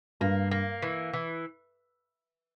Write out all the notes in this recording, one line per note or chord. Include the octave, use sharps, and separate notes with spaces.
G2 A#3
A#3
E3
E3